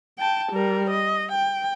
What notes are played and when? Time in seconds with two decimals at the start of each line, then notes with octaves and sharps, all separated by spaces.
0.19 G5 A5
0.52 G3 A#4
0.90 D#5
1.32 G5